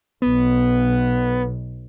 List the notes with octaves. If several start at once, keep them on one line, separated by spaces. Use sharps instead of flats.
B1 B3